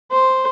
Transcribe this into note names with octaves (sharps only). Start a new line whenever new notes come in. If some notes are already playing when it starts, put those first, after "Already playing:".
C5